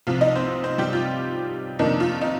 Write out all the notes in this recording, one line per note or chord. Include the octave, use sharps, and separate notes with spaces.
C2 C3 F3 F4 F5
D#4 D#5
C4 C5
C4 C5
G3 G4
F4
F2 C3 D#3 A#3 D4 D#4
F4
D#4